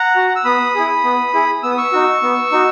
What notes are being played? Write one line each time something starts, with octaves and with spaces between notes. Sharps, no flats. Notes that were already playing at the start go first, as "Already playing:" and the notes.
Already playing: F#5 A#5
F#4
E6
B3 B5 D#6
E4 G#4
B3
E4 G#4
B3 E6
D#6
C#6 E6
D#4 F#4
B3
D#4 F#4